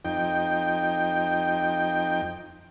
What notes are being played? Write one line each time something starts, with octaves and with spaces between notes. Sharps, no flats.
F2 D#4 G5